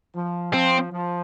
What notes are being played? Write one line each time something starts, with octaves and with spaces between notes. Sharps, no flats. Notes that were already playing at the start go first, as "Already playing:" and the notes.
F3
F3 C4
F3